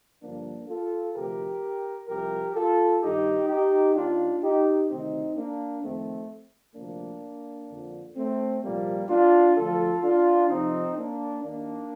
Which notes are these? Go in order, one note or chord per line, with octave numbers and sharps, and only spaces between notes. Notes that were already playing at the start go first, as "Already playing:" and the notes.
G2 D3 F3 A#3 D4
F4 A4
D2 C3 F3 G4 A#4
C2 C3 F3 G4 A#4
F4 A4
G2 D#3 D#4 G4
D#4 G4
D#2 D#3 D4 F4
D#4 G4
D2 C3 D#3 C4 D#4
A#3 D4
F2 D#3 A3 C4
D2 C3 F3 A#3 D4
F2 D3 F3
A3 C4
C2 A#2 F3 G3 A#3
D4 F4
D2 D3 F3 F4 A4
D4 F4
F2 C3 F3 C4 D#4
A#3 D4
D#2 D#3 A#3 D4